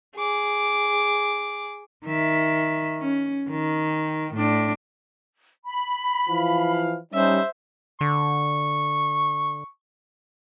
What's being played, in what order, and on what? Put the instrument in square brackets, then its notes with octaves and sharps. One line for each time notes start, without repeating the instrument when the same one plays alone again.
[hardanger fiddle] G#4 D6
[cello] D#3 E5
C#4
D#3
A2 D4
[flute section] B5
[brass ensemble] E3 F3 F5
[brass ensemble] G3 C#4 D#4 [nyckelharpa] C5 E5
[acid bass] D3 [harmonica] C#6